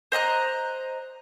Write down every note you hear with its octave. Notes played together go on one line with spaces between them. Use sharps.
C5 D#5 A#5 F#6